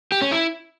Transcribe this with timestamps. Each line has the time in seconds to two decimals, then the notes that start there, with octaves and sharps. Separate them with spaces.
0.12 G4
0.22 C#4
0.31 E4